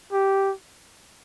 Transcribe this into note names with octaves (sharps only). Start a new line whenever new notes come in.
G4